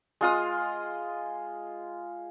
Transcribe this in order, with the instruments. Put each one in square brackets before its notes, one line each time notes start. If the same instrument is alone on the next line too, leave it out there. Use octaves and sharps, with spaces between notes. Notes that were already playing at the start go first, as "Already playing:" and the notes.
[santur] G#3 F4 D#6